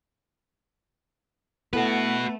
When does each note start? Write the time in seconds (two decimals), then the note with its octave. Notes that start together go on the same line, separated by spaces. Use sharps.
1.73 A3 B3 E4 F#4 A4 B4 F#5